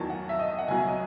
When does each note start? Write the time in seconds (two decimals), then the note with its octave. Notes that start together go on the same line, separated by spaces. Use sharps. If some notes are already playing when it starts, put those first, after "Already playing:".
Already playing: E2 D#3 F#3 A5
0.10 F#5
0.29 E5
0.39 D#5
0.58 F#5
0.67 C#2 B2 F#3 G#5
0.78 E5
0.87 D#5